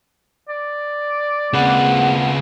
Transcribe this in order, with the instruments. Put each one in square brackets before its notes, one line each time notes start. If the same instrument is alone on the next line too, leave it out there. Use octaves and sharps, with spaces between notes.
[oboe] D5
[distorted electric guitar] C#3 B4 [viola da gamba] G#3 A#3 C4 [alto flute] F#5